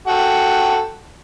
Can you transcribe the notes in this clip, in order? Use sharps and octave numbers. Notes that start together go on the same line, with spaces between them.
F#4 A4 G5